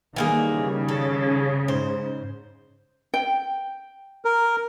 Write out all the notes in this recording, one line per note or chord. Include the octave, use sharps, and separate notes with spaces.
D#3 E3 G3 A#3 G#4
C#3
A4
G#2 C5
G5
A#4